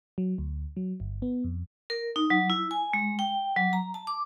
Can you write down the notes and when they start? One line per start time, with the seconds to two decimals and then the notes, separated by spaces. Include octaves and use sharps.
0.18 F#3
0.38 D2
0.77 F#3
1.00 G1
1.22 B3
1.44 F2
1.90 A#4
2.16 D#4
2.30 F#3
2.50 E4
2.71 G#5
2.93 G#3
3.19 G5
3.57 F#3
3.73 A#5
3.94 A5
4.07 D6